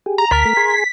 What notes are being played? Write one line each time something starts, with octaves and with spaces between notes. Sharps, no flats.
G4 G#4
A#5
D2 A#4 A5 B6
A3
G#4 G#5 C6